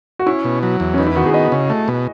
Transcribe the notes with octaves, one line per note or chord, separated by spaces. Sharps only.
F#4
C#4 E4
B2
F#3
E2
C#4
B3 D#4
E4
D#3 F#4
G#4
B3 D#5
C#3
A3
B2